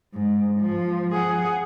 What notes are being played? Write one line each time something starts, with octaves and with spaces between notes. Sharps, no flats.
G#2
F3
G#4 F#5